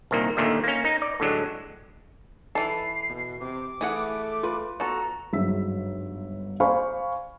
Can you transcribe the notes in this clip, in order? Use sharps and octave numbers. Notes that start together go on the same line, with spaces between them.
C2 A#2 D#3 A#3
D#2 A#2 D3 D#3 A3
A#3 C#4
D#4
D5
A2 D3 F#3 G#3
E3 A4 A5 C7
B2
C3 D6
E3 A3 G#4 F#5
F4 B4
B3 F#4 A4 A#5
G1 G#2 F#3 E5 E6 B6
C5 D5 F5 G#5 B5 C#6